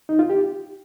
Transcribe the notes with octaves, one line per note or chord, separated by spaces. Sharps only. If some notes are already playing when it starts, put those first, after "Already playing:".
D#4
F4
G4